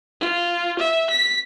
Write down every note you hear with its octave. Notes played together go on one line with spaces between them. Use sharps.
F4
E5
B6